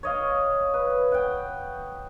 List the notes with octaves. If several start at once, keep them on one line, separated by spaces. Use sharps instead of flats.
C#5 D#5 F5
B4
F#5 G5